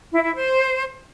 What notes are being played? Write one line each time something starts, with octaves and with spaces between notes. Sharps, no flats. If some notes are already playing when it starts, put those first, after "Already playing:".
E4
E4
C5